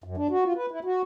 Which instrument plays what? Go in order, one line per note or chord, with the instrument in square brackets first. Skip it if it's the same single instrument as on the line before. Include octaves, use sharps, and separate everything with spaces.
[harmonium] F#2
D4
F#4
F4
B4
E4
F#4